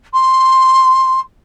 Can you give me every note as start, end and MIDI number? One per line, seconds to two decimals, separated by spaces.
0.14 1.20 84